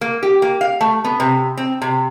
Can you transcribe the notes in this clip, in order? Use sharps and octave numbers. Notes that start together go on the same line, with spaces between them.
A#3
G4
A#3
F5
A3
B3
C3
C4
C3